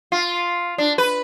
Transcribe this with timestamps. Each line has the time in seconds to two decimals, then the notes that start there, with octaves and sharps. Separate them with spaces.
0.12 F4
0.78 D4
0.98 B4